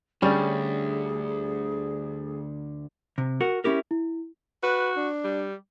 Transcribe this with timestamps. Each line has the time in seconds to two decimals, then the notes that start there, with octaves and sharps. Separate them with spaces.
0.22 D2 D3 G3 C#4 G#4 D5 A6
3.18 C3
3.41 F#4 A#4 F#5
3.64 C#4 E4 G4 A#4
3.91 E4
4.63 F#4 B4
4.97 D4
5.25 G3